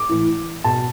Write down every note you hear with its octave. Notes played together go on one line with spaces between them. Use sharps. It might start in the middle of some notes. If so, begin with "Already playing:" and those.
Already playing: D6
A2 E3
B2 A5